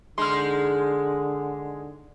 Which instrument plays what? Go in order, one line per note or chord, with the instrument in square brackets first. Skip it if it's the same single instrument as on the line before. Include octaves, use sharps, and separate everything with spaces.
[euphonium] D3 [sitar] G#3 D#4 [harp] C6 F6